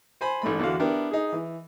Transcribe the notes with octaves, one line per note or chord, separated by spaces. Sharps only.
C5 G#5 B5
A1 G#2 A3 B5
E2 D3 D4 F#4 F5
B3 D4 E4 G4 A#4
D#4 G#4
E3